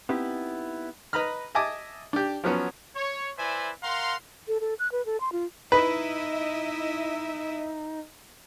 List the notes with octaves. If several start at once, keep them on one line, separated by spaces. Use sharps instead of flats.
B3 C4 D#4 E4 G4
B4 D#5 A#5 B5 F6
D#5 E5 G#5 A5 D6 D#6
D4 G4
F3 F#3 B3 C#4
C#5
E4 B4 C5 D5 E5 G#5
A#4 F5 F#5 A#5 C6
A4
A4
F#6
B4
A4
C6
F4
D#4 E4 B4 D#5 E5